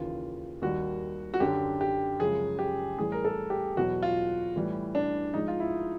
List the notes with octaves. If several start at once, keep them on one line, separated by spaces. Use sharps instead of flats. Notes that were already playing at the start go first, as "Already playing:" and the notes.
Already playing: D#2 C#3 E3 F4
D#2 D#3 G3 F#4
F#4
F#2 D3 F#3 G4
G4
F#2 C#3 F3 G#3 G#4
G4
A2 E3 G3 G#4
A#4
A4
G4
E2 B2 F#3 F#4
F4
A2 E3 G3
D4
G#2 F3 G#3 D#4
F4
E4